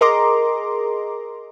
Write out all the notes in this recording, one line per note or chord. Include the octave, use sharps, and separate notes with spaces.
G#4 A#4 D#5 A#5 C6 D6